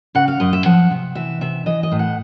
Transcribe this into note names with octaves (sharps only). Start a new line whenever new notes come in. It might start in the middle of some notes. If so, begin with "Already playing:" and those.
C#3 F#5
F5
F#2 D#5
E5
F3 F#5
C3
E3 E5
C3 E5
E3 D#5
D#5
A2
F#5